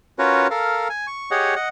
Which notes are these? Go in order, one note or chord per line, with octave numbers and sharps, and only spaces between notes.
C#4 F4 F#4 A#4 B4 C#5
A4 A#4 F5
G#5
C#6
G4 G#4 C#5 D#5 F#5
D#5 F#5